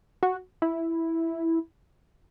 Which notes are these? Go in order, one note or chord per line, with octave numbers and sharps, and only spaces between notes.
F#4
E4